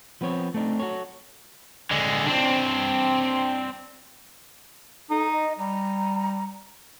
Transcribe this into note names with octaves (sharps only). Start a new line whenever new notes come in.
F3 B3 C4 C#5
A3 C4 D4 D#4
F#4 G4 A4 C#5
D3 G#3
C4 D4
D#4 A4
D#5
G3 A#5